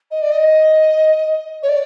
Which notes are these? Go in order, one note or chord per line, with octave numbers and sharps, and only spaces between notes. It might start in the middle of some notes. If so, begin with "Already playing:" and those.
D#5
D5
D#5
C#5
D5